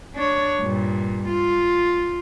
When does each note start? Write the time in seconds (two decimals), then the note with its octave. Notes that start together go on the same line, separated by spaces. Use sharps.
0.15 D4 C#5
0.61 G2 A#2
1.28 F4